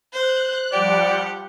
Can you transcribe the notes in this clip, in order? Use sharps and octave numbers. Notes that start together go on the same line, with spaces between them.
C5 F#6
F3 G3 G4 D5 F#5